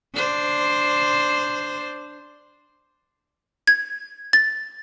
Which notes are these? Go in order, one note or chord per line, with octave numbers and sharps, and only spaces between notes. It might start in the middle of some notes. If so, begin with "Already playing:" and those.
D4 C5
G#6
A6